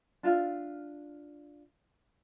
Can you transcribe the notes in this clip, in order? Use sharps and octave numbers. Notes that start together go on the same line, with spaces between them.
D4 F4 E5 F5